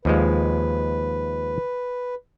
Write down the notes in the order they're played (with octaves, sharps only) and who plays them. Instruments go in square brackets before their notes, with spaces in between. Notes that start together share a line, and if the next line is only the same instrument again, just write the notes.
[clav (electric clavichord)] D#2 F3 G#3 [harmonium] B4